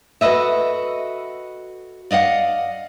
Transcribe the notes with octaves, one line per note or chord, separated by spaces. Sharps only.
F#4 A4 B4 D#5 E5
D5 D#5 F5 F#5